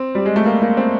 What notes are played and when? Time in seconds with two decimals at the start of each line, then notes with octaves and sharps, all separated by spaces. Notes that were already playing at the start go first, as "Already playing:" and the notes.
Already playing: C4
0.15 G3
0.26 G#3
0.36 A3
0.46 A#3
0.62 A#3
0.77 C4